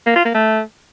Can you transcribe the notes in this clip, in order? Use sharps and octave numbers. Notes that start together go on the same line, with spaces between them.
A#3
F4
A#3
A3